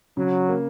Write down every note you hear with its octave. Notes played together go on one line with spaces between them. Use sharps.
C#3 F#3
A#3